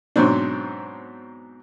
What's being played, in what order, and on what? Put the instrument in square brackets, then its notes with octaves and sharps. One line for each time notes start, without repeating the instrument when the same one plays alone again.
[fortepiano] G#2 B2 F#3 C4 D4